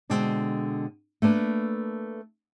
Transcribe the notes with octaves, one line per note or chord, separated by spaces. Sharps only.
B2 D3 G#3 C4
A3 A#3 D4 B4